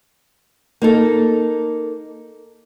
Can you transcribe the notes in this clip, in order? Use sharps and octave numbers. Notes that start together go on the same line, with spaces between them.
A#3 D#4 A4